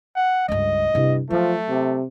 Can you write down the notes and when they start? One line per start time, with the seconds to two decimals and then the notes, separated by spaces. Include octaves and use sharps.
0.16 F#5
0.49 C#2 G2 D#5
0.95 G2 C3 E4
1.30 F3 F#3 A3
1.69 C3